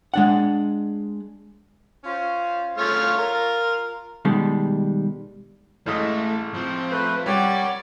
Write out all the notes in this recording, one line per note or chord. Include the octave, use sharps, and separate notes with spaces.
G#3 D4 F#5
C#4 F4 C5
A3 F4 C#5 F6
A#4
B2 D#3 G3 G#3
A1 G#3 A3 D#5
F3 C4
A3 B4
G3 A#4 C#5 D5 F#5